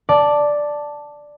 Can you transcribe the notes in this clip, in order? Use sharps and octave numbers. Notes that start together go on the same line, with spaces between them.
D5 A5